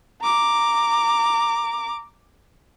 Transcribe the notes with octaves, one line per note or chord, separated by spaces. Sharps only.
A#5 D6